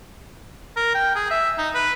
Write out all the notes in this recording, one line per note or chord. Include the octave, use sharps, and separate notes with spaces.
A#4
G5
G#4
E5
D#4
B4